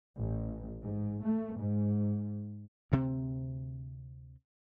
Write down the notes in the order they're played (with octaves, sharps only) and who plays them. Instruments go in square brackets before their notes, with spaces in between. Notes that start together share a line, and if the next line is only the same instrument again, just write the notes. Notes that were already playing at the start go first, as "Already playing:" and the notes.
[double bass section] A1
G#2
A3
G#2
[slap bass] D2 C3 C4